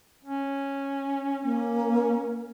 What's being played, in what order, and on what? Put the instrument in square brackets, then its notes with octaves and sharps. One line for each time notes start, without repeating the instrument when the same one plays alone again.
[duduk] C#4
[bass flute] A#3 [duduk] C#4